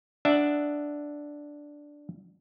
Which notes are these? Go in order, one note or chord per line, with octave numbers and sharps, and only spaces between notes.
D4 E5 F#5